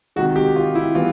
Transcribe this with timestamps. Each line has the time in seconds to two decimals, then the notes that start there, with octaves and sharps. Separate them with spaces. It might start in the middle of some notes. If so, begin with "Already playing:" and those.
0.16 C3 D#3 G#3 F#4
0.36 G4
0.56 F4
0.75 E4
0.95 E3 G3 B3 F4